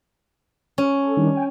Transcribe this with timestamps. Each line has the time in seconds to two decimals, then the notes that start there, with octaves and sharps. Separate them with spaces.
0.78 C#4
1.02 A4
1.17 D#3 G3 D4
1.35 G5 G#5